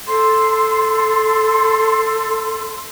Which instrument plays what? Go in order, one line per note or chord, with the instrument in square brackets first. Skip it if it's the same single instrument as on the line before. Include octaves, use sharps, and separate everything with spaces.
[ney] A4 [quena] C6